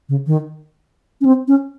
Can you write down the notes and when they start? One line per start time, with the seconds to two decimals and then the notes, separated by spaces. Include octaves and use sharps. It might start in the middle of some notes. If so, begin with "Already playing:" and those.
0.09 C#3
0.27 D#3
1.21 C#4
1.25 C4
1.48 C#4